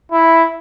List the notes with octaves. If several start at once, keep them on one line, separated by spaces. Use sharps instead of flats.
E4